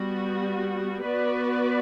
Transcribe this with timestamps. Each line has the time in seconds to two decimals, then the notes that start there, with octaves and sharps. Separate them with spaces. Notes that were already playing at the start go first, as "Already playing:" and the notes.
Already playing: G3 B3 F#4
1.02 B3 F#4 B4 D5